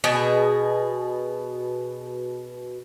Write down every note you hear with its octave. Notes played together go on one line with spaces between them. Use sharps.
B2 G#4